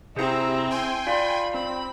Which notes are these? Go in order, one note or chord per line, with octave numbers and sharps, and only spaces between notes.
C3 C4 E4 G#4 A#5 G6 C7
G5 G#5 C6
F4 D5 F5 B5
C4 B5